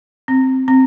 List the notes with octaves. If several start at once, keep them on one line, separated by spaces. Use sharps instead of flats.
C4
C4